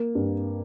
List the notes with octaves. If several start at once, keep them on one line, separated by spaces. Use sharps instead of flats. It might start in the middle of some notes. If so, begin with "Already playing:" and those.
Already playing: A#3
G2